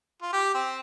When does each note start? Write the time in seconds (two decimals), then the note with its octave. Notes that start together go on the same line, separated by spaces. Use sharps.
0.22 F4
0.33 G4
0.54 C4